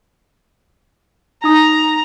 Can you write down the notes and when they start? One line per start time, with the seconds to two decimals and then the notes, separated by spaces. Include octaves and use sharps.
1.44 D#4 A#5 D#6